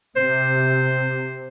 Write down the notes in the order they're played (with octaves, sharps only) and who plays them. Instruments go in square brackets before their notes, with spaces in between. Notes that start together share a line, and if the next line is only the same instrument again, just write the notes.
[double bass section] C3 [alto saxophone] C5